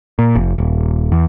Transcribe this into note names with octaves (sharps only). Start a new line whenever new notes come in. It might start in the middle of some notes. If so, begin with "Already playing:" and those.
A#2
F1
D#1
E2